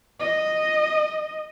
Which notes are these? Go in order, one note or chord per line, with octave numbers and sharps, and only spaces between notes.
D#5